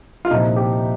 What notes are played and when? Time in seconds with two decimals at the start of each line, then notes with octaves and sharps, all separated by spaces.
0.25 F4
0.30 C2 A#2 F3 D#4
0.56 G4